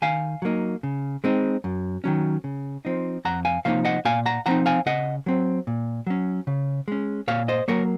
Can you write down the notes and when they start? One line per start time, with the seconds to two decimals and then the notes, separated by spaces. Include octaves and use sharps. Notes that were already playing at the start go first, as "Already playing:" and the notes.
0.02 D#3 F5 G#5
0.42 F#3 A#3 D#4
0.83 C#3
1.24 G#3 C4 D#4
1.64 F#2
2.04 D#3 F#3 C#4
2.44 C#3
2.85 F3 C4 D#4
3.25 F2 F#5 A#5
3.45 F5 G#5
3.65 C3 F3 A#3 D#4 C#5 F5
3.85 D#5 F#5
4.05 A#2 F5 G#5
4.26 F#5 A#5
4.46 F3 C4 D#4 F#5 A#5
4.66 F5 G#5
4.86 C#3 D#5 F#5
5.26 F#3 C4
5.67 A#2
6.07 F#3 C#4
6.47 C#3
6.88 G#3 C#4
7.28 A#2 C#5 F5
7.48 C5 D#5
7.68 F#3 A#3 A#4 C#5